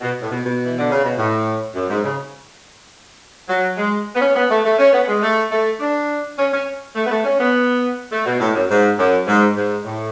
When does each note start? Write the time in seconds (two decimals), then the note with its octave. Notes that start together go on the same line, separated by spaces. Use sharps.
0.01 B2
0.21 A2
0.31 B2
0.44 B2
0.65 E3
0.78 D3
0.91 C#3
1.04 B2
1.17 A2
1.75 F#2
1.89 G#2
2.04 C#3
3.49 F#3
3.77 G#3
4.16 B3
4.21 C#4
4.35 B3
4.50 A3
4.64 A3
4.79 C#4
4.93 B3
5.08 G#3
5.22 A3
5.51 A3
5.80 D4
6.38 C#4
6.52 C#4
6.96 A3
7.06 B3
7.11 A3
7.25 C#4
7.39 B3
8.12 A3
8.26 B2
8.40 A2
8.55 F#2
8.70 G#2
8.98 F#2
9.27 G#2
9.56 G#2
9.85 A2